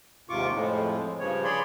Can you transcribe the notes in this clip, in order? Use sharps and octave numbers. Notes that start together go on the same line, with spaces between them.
D#2 G#2 C3 F4 C#6 D6
F2 A2 F3 G#3
G2 C#3 F3 C#5
G#4 C#5 D5 B5 C6